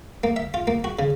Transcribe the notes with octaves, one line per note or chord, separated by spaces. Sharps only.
A#3
E5
F4
A#3
F#4
C#3